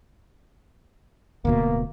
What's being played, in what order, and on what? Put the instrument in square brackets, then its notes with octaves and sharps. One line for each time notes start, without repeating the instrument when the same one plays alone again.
[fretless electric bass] D1 D2 B2 [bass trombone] A#3